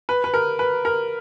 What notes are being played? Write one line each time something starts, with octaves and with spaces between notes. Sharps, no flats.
B4
B4
A#4
B4
A#4